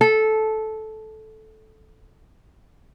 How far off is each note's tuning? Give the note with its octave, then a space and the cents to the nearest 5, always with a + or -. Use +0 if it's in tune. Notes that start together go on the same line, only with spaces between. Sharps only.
A4 -10